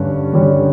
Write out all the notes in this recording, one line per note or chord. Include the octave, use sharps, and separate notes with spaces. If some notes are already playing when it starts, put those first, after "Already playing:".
Already playing: G2 D3 G3 C#4 G4
G2 D3 G3 C#4 G4